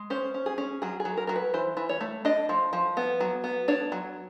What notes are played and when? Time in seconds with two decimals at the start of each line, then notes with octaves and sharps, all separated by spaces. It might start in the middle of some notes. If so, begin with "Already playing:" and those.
Already playing: G#3
0.10 C#4 C5
0.34 C#4
0.46 G#4
0.58 C#4
0.82 F#3 G#4
1.00 G#4
1.05 F#3
1.17 A#4
1.27 F#3 A#4
1.36 B4
1.54 E3 C5
1.77 E3
1.89 C#5
2.01 A3
2.25 D4 D#5
2.49 F3
2.73 F3
2.97 B3
3.20 F#3
3.44 B3
3.68 D4 C#5
3.92 F#3